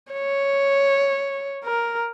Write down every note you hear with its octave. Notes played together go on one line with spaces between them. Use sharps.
C#5
A#4